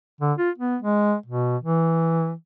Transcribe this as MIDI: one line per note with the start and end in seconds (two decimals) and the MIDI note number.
0.21 0.33 50
0.38 0.50 65
0.58 0.77 59
0.82 1.15 56
1.26 1.57 47
1.62 2.33 52